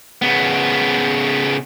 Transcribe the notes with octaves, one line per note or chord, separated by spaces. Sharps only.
C#3 B3